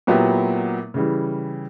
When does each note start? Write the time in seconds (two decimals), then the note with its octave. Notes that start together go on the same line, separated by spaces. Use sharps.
0.07 A#2 F#3 B3 E4 G4
0.94 C#3 E3 G3